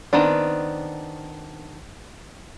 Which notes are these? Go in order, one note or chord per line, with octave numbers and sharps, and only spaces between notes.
D#3 B3 C4 D4